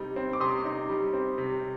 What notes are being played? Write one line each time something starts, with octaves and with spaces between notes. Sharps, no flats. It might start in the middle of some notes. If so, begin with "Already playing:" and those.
Already playing: C3 G3 D#4
C4
D6
C3 C6 D#6
D#4
G3
C4
C3